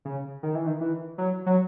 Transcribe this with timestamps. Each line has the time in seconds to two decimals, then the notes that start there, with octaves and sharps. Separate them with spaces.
0.05 C#3
0.43 D#3
0.55 E3
0.66 D#3
0.81 E3
1.18 F#3
1.46 F#3